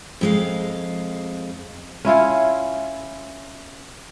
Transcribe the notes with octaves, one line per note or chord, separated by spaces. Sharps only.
F2 G#3 F5
C#4 E4 F4 C#5